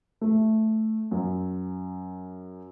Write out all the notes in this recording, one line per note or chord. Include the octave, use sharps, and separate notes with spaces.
A3
F#2